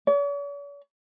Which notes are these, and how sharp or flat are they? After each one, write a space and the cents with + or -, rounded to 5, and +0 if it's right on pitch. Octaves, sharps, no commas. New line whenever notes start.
C#5 +45